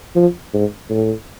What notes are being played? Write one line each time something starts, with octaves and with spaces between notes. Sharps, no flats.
F3
G#2
A2